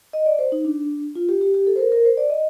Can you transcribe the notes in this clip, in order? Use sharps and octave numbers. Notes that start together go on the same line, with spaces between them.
D#5
D5
C5
D#4
D4
F4
G4
G4
G4
A4
C5
A#4
A#4
C5
D5
D#5